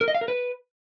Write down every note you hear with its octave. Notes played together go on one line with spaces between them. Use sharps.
A#4
D#5
F5
A#4
B4